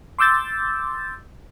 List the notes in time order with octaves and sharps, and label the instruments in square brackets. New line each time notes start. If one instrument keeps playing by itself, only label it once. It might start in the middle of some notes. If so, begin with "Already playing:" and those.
[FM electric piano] C6 D6 E6 G6 A6